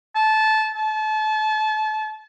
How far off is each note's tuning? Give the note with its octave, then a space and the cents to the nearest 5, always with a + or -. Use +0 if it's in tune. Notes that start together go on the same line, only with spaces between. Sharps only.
A5 -15
A5 -30